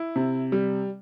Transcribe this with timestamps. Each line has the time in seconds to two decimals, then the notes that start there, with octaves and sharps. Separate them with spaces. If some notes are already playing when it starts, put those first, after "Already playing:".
Already playing: E4
0.16 C3
0.52 G3